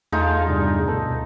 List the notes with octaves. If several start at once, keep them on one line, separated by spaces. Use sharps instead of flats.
E2 A3 D#4 F4 G#4 A4 F5
G2 C3 G3 D4 G#4
D2 B2 A4 A5